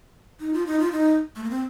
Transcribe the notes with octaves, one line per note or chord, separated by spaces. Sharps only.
D#4
F4
D#4
F4
D#4
A3
A#3
C4